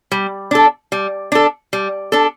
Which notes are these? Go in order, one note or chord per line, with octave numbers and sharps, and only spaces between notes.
G3
D4 A4
G3
D4 A4
G3
D4 A4